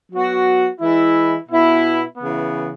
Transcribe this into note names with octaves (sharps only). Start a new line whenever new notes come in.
F#3 B3 F#4
E3 G#3 E4
B2 B3 E4
C#3 E3 B3